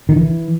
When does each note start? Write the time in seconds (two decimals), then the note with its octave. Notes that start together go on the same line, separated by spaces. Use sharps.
0.09 D#3
0.16 E3